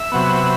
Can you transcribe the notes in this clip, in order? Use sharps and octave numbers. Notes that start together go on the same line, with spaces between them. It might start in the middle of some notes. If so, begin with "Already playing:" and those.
Already playing: E5
C3 F#3 B3